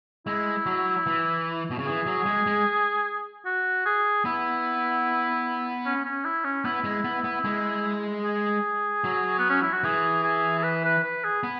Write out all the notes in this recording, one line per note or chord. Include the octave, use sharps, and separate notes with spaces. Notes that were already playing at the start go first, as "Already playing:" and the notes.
G#3 E4
F#3
E3
B2
C#3
E3 G#4
F#3
G#3
G#3
F#4
G#4
B3 E4
C#4
C#4
E4
C#4
B3 E4
G#3
B3
B3
G#3
G#4
F#3
B3
C#4
E4
F#4
E3 G#4
G#4
G#4
B4
B4
B4
G#4
B3